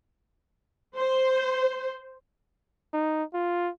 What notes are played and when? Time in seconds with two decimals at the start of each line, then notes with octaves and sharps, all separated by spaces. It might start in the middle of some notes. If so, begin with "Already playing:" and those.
0.96 C5
2.93 D#4
3.34 F4